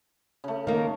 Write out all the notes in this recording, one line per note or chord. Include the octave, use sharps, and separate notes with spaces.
C#3 A3
D#3 A#3